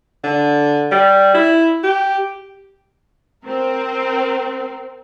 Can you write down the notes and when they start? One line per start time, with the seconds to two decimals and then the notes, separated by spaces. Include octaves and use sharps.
0.24 D3
0.92 G3
1.35 E4
1.84 G4
3.45 C4 A#4